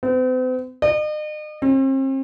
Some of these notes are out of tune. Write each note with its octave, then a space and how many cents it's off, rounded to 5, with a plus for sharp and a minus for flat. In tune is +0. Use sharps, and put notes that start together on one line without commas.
C4 -45
D#5 -40
C4 +40